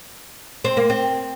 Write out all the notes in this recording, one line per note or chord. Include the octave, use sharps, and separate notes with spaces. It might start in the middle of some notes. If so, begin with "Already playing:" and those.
C4
A#3
C4